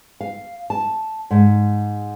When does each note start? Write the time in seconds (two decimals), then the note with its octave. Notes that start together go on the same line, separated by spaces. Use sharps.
0.21 F5
0.70 A5
1.31 G#2